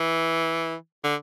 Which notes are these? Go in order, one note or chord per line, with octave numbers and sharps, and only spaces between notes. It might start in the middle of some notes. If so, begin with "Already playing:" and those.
Already playing: E3
D3